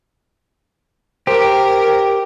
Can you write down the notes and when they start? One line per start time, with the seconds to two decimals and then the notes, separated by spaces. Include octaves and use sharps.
1.27 G4 A#4 C5